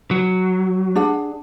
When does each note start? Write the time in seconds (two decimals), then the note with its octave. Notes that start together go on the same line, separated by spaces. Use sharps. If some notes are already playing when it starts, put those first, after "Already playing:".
0.11 F#3
0.95 D4 G#4 F#5